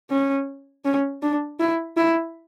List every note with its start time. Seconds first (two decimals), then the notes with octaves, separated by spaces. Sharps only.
0.10 C#4
0.85 C#4
1.22 D4
1.60 E4
1.97 E4